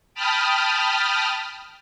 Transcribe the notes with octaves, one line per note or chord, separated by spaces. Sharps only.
G5 A5 B5 D#6 F6